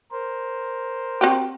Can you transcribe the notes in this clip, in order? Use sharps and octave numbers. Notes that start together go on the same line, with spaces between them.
A#4 C5
C4 F#4 G4